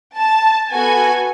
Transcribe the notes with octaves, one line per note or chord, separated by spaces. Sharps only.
A5
B3 F#4 A4 G#5